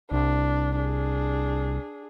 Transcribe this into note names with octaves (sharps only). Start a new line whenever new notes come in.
C2 D4
D4 G#4